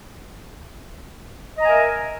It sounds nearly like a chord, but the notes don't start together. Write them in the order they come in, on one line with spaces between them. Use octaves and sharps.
D#5 A#5 G#5 E5 A#4